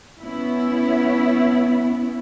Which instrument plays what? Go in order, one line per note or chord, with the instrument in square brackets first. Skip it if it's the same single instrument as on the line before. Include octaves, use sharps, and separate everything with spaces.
[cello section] B3 C#4 E4